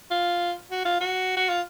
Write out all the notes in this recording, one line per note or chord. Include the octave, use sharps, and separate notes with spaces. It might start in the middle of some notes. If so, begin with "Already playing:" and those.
F4
F#4
F4
F#4
F#4
F4